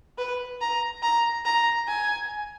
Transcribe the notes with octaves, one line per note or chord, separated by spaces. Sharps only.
B4
A#5
A#5
A#5
G#5